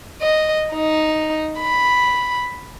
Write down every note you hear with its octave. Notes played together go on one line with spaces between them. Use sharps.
D#5
D#4
B5